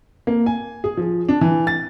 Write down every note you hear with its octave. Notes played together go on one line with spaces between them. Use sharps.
A#3
G#5
G#4
F3
D4
E3
A6